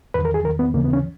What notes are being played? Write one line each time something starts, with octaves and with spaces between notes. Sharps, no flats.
E2 D#3 B4
A#4
G#4
E2 D#3 A#4
B3
D#2 C#3 E3 A#3
B3
C#4